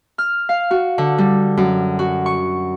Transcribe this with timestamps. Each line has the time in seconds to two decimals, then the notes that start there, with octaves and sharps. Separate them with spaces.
0.18 F6
0.49 F5
0.71 F#4
0.98 D3
1.18 G3
1.57 F#2
1.99 F#4
2.26 C#6